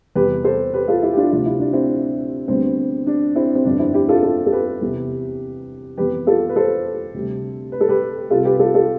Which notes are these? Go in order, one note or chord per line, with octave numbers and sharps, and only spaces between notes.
E2 C3 G3 G4 B4
A4 C5
G4 B4
F4 A4
E4 G4
G4
D4 F4
D2 C3 F3 F4
E4
D4
C4 E4
D2 D3 G3 B3 C4
D4
C4 E4
C4
G1 F2 D3 D4
C4 E4
E4 G4
F4 A4
F4 A4
A4
G4 B4
E2 C3 E3 B3
F2 E3 B3 G4 B4
F4 A4
B4
A4 C5
D2 C3 G3
B4
A4
G4 B4
C2 C3 G3 F4 A4
G4 B4
F4 A4
F4 A4